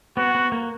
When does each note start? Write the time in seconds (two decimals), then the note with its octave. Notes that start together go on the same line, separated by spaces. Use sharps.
0.17 B3 F#4
0.35 B3
0.52 A#3